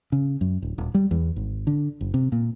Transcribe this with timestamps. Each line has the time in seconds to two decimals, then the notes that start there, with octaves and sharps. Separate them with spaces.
0.12 C#3
0.41 F#2
0.62 D1
0.78 D#1
0.94 G3
1.11 E2
1.36 G#1
1.67 D3
2.01 F#1
2.14 C3
2.32 A#2